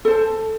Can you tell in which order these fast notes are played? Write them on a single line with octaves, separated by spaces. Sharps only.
A4 C5 A5